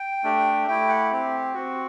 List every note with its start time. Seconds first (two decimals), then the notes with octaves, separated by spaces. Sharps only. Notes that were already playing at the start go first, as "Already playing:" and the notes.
Already playing: G5
0.24 A3 D4 G4
0.68 A3 E4 G4 G5
0.89 F#5
1.12 C4 G4
1.54 C4 F#4